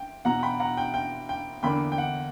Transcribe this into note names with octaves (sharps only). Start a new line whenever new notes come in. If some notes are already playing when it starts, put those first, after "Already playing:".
Already playing: G5
E2 B2 F#3 F#5 A#5
G5 B5
F#5 A#5
G5
G5
G5
E2 D3 A#3 G5 B5
G5
F#5